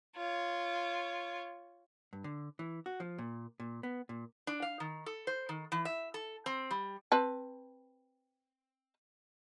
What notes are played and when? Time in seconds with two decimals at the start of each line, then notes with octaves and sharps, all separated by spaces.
0.16 F4 C#5
2.13 G2
2.24 D3
2.59 E3
2.86 F#4
3.00 F3
3.18 A#2
3.60 A#2
3.83 B3
4.09 A#2
4.47 D4
4.62 F5
4.80 D#3
5.06 A4
5.27 C5
5.49 D#3
5.72 E3
5.85 E5
6.14 A4
6.46 C4
6.71 G3
7.12 C4 B4 A5